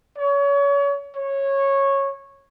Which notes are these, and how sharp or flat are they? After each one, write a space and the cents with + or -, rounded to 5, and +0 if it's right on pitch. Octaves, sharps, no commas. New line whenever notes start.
C#5 +30
C#5 -15